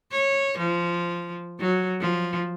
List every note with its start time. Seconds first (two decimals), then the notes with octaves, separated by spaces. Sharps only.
0.12 C#5
0.58 F3
1.60 F#3
2.00 F3